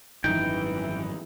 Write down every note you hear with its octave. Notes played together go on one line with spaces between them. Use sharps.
G#1 F#2 E3 D#4 G5